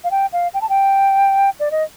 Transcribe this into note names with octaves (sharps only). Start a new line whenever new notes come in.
F5
G5
F5
G5
A5
G5
D5
D#5